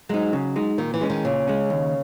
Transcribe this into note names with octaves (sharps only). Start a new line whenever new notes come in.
F#3 G#3 D#4
C#3
G#3 D#4
A#2 D#3
E3
G#3 C#4
D#3
A#2 C#3
G#3 C#4
D#2